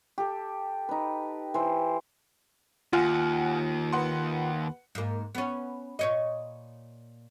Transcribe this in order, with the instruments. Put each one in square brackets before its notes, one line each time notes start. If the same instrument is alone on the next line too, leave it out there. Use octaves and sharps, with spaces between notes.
[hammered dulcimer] G4 A4
D#4 B4
E3 C5
[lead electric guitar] D#2 [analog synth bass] F4 [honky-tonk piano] F#5 G#5 F6
[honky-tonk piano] B4 F#5 C6
[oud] G#2 A#3
B3 C#4
A#2 C#5 D#5